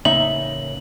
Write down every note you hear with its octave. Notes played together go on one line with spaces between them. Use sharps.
A1 C#3 A#3 D#4 E5 F#7